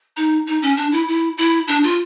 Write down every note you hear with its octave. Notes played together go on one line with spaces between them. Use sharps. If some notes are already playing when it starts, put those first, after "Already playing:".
D#4
D#4
C#4
D4
E4
E4
E4
D4
F4